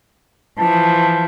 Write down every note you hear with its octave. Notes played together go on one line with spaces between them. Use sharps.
E3 F3 A5